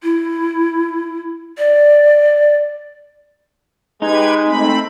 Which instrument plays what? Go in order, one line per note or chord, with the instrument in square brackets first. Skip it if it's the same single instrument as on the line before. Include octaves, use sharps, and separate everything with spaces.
[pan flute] E4
D5
[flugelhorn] G#3 [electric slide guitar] D#4 [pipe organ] G4 B4 G#6
[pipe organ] A3 C4 B5